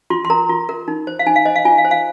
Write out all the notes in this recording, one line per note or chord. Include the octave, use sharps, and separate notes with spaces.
F4 C6
C6
A#4 A#5
F4
A#4
D#4
C5
F5
D#4 G#5
F5
C5 D#5
F5
F4 G#5
F5
C5
F5